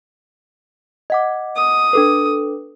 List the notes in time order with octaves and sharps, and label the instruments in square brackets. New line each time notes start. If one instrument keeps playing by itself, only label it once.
[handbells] D#5 F#5 D6
[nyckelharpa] D#6
[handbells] D4 A4 B4